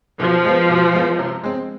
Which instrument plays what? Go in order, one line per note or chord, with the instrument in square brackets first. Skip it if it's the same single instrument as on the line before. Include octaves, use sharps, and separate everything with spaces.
[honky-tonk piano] B2 [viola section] F3
[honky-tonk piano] G#3 B3 F4
B2
G#3 B3 F4
C3
G#3 C4